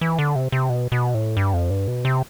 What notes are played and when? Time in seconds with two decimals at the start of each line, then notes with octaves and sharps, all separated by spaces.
0.01 E3
0.19 D3
0.36 C3
0.52 C3
0.70 B2
0.92 B2
1.14 A2
1.37 G2
1.53 F2
1.70 G2
1.88 B2
2.05 C3